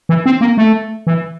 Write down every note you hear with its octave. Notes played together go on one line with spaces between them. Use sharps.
E3
C4
A#3
A3
E3